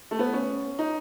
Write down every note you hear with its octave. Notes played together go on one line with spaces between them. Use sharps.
A3
B3
C#4
D#4